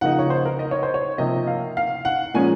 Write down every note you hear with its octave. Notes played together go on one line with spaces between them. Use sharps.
C#3 F3 A#3 D#4 F#5
C#5
C5
A#4
D#5
C#5
C5
C#5
C3 F3 A#3 D#5
F5
F5
F#5
A#2 F3 G#3 C#4 G#5